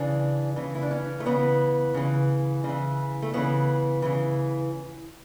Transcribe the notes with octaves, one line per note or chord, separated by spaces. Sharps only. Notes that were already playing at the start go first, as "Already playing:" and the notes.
Already playing: C#3 E3 D4
C#3 E3
E4
D4
C#4
A3
C#3 E3 B3
C#3 E3
C#3
E3
A3
C#3 E3 B3
C#3 E3